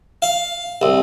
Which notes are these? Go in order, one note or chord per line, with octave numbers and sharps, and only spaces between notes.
F5
C2